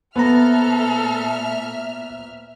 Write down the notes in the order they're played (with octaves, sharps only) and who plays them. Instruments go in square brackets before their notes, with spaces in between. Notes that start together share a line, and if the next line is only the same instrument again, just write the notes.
[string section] A#2 E5 F6 [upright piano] B3 [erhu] A4 [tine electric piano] C5 A#5